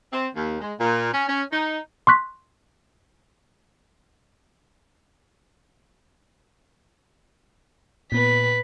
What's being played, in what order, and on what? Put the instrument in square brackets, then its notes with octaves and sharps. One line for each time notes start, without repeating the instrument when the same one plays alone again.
[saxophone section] C4
D#2
G#3
A#2
C#4
C#4
D#4
[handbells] C6 C#6 F#6 B6
[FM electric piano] A#2 B3 [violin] B4 B6